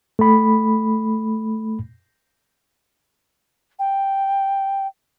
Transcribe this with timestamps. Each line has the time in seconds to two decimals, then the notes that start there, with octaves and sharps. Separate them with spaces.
0.19 A3 B5
3.79 G5